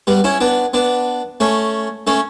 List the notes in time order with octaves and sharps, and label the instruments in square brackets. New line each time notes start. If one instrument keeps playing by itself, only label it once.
[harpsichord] G3 B3
C#4 E4
B3 D4
B3 D4
A3 C#4
A3 C#4